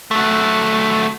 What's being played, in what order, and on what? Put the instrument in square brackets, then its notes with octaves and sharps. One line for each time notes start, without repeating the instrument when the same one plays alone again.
[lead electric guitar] F#3 A3